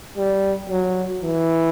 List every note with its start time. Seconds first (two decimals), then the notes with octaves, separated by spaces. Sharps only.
0.17 G3
0.69 F#3
1.21 E3